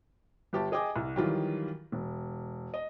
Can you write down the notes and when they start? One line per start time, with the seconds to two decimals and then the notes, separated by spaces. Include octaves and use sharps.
0.53 G1 G4 A5
0.72 G#4 D#5 G5 G#5 D6
0.96 C2
1.16 D#3 E3 F#3 G3 F4
1.92 E1
2.74 D#5